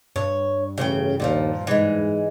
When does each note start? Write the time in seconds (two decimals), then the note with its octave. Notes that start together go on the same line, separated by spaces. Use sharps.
0.16 G2 C#5
0.78 A1 C#3 C5 G5
1.20 D#2 A#2 D3 F3
1.67 G#2 E3 G#3